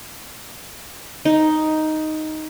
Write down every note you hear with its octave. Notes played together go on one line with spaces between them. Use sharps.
D#4